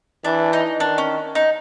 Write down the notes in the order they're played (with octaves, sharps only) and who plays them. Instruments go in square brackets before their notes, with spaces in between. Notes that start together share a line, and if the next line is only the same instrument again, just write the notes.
[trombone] E3 [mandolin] D4
[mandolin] D#4
[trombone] D#3 [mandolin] D4
[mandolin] C#4
D#4